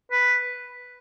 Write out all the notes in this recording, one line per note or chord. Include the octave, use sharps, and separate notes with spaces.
B4